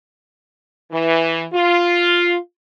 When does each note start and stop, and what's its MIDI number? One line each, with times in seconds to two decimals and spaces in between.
0.92 1.45 52
1.53 2.36 65